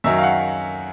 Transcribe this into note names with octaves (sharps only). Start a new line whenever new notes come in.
F#2 D#3 F#3 E5
F5
F#5